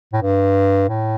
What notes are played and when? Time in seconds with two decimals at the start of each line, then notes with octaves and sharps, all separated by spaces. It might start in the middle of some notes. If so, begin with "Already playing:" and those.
0.13 A2
0.22 G2
0.89 A2